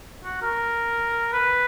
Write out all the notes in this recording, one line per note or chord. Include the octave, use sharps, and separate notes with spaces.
F#4
A#4
B4